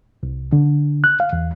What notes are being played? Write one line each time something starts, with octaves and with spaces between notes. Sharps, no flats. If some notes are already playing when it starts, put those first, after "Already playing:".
C2
D3
F#6
F5
E2